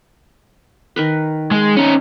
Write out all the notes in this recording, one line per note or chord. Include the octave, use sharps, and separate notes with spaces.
D#3 A#4 B4
G#3
C#4 D#4